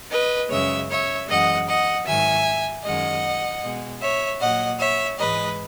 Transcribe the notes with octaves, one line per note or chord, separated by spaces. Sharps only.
B4 D#5
F#2 C#3 G#3 C#5 E5
C#5 E5
F#2 E3 G#3 D#5 F#5
D#5 F#5
G#2 D#3 F#3 E5 G#5
F#2 D#3 G#3 D#5 F#5
B2 G#3
C#5 E5
A#2 F#3 D#5 F#5
C#5 E5
G#2 E3 G#3 B4 D#5